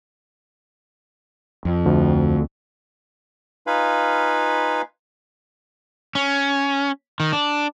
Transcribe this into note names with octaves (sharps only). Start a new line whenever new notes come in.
F2
D2
D#4 F4 B4 F5 G#5 B5
C#4
D#3
D4